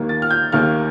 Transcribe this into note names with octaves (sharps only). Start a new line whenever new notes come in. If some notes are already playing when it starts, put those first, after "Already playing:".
Already playing: D#2 D#3 A#3
A6
F6
G6
D#2 D#3 A#3 F6